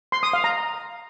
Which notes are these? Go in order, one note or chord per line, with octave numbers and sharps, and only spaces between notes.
C6
D#6
F5
A#5